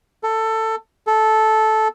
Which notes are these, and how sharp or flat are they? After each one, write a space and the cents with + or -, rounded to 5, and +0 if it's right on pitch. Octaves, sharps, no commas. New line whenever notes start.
A4 +15
A4 -10